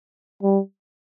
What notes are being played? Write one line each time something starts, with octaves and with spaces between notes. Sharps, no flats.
G3